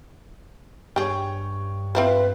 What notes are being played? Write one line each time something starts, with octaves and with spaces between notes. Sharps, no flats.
G2 G4 G#4 C#5 G5
C4 E4 F4 B4 C5